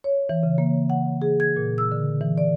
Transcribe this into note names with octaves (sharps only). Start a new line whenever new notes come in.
C#5
E3
C#3
A#3
F#5
G#4
G#6
A#2
E6
D3
E3
D5